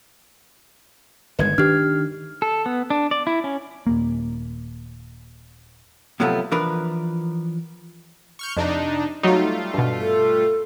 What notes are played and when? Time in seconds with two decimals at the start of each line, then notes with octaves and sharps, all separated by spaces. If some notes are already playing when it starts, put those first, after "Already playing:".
1.39 G1 D#3 G#3 B4 G#6
1.58 D#3 D4 G4 F6
2.42 A4
2.66 B3
2.90 D4
3.11 D5
3.27 E4
3.44 C#4
3.87 D#1 A#3
6.20 A2 C3 F3 F#3 A3 B3
6.51 E3 F3 D4 A#4 B4
8.39 C#6 F6 G6
8.57 F2 C3 D4 D#4
9.23 F#3 G3 A3 D#4 F4
9.74 G2 B2
9.98 A4